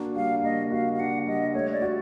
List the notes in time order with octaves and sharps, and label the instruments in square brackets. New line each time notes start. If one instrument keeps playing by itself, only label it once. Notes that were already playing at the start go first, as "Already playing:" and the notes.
Already playing: [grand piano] A#3 D4 F#4
[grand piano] G3 [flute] F5
[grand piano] A#3 [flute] D#5
[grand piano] F#4 [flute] F5
[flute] F5
[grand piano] D4 [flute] F#5
[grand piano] G3 [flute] D#5
[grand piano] A3 [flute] C#5
[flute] D5
[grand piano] F#4